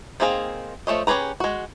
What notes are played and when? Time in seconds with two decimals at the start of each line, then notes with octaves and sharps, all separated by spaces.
0.20 D#3 A#3 C4 G#4 F5
0.87 F3 A3 C#5 D#5
1.07 C#4 G4 G#4 B4 A#5
1.40 G#3 F#4